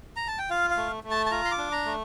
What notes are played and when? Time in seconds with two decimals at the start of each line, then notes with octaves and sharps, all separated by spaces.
0.16 A#5
0.27 A5
0.38 G5
0.50 F4 F5
0.70 F5
0.77 A3
1.04 A3
1.11 A5
1.26 A5
1.31 F4 A#5
1.45 C6
1.51 D6
1.58 D4
1.72 A#5
1.85 A3